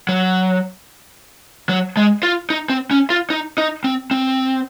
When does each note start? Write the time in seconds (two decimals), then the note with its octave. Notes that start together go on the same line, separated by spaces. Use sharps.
0.09 F#3
1.69 F#3
1.97 G#3
2.23 F4
2.50 D#4
2.70 C4
2.91 C#4
3.10 F4
3.30 D#4
3.58 D#4
3.84 C4
4.11 C4